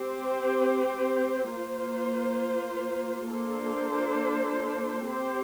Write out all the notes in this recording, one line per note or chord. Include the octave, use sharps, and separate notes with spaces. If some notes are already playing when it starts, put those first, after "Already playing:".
Already playing: C4 G4 C5
A#3 F4 C5
A#3 D4 F4 A4 C5
C4 G4 C5